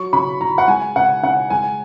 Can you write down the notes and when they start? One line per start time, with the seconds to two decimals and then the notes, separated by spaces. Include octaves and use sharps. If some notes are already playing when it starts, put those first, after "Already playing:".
Already playing: F#3 C#6
0.13 C#3 B5
0.41 C#3 A#5
0.58 F#5
0.68 G#3 G#5
0.96 C#3 F#5
1.23 C#3 F#5
1.50 G#3 G#5